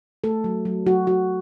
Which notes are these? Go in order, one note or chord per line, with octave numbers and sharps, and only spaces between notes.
A3 A4
F#3
F#3
F#3 F#4
F#3 F#4